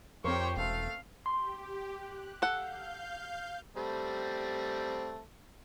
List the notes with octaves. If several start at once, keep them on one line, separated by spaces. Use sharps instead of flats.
F2 C4 G4 A#4 C5 C#5 C#6
E1 A3 F5
G4 C6
F#6
A4 F5 F#5 G6
G3 A3 C4